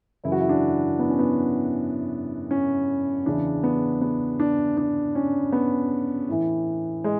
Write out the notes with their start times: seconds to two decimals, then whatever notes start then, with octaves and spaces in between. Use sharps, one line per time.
0.24 F#2 C#3 E3 E4
0.32 F#4
0.40 E4
0.49 D4
0.99 B3
1.09 C#4
1.19 B3
2.51 C#4
3.26 E2 C#3 E3 D4
3.63 B3
4.01 B3
4.40 D4
4.77 D4
5.15 C#4
5.52 B3
6.29 A2 E3
7.04 G#3